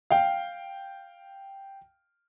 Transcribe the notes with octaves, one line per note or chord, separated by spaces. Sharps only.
F5 G5